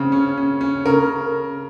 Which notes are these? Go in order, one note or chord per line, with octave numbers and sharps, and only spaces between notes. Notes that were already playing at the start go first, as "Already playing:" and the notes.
Already playing: C#3 C4
C#4
C#4
C#4
C#3 A#4